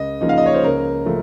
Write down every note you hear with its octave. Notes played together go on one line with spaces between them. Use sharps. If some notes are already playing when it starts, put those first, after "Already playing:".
Already playing: C#2 D#5
C#3 F3 A#3 D#4
F5
D#5
C#5
C5
C#2 A#4
C#3 F3 A3